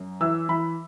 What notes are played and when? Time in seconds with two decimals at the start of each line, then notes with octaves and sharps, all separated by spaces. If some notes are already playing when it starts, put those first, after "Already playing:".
Already playing: F#2
0.21 E3 E6
0.49 E3 B5